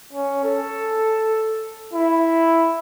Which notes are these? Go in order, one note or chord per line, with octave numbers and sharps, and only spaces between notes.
C#4
A4
E4